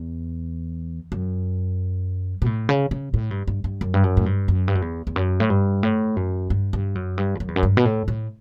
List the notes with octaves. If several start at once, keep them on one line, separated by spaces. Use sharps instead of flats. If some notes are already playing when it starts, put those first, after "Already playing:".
Already playing: E2
F#2
B2
A2
C#3
C#3
A2
G2
G2
G2
F#2
G2
F#2
A2
G2
F#2
G2
F#2
E2
E2
F#2
A2
G2
A2
F#2
G2
G2
F#2
G2
E2
F#2
E2
F#2
G2
B2
A2
A2